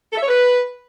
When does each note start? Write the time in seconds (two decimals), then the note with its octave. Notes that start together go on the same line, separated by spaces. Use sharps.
0.12 A4
0.18 E5
0.23 C#5
0.28 B4